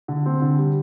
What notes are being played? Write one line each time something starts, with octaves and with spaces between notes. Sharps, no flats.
D3
C4
D3
G3